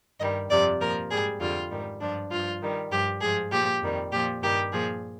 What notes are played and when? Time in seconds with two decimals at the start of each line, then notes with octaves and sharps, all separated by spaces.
0.20 G2 D#3 G3 D#5
0.50 F2 C3 F3 D5
0.80 A#2 F3 A#4
1.11 G#2 G3 G#4
1.40 F2 D3 G3 F4
1.71 G#2 D#3 G3
2.01 G2 F3 D4
2.31 G2 F3 F4
2.62 G2 D#3 G3
2.92 G2 F3 G4
3.21 G#2 F3 G#4
3.52 A#2 F3 G4
3.82 F2 D#3 G3
4.11 A#2 F3 G4
4.42 G2 D#3 G3 G4
4.72 A#2 F3 G#4